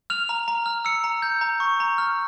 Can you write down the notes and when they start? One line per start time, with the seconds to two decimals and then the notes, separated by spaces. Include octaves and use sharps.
0.10 F6 F7
0.29 A#5
0.48 A#5
0.66 F6
0.85 E6 C#7
1.04 A#5
1.22 G6
1.41 A#5
1.60 C#6
1.80 A#5
1.98 F6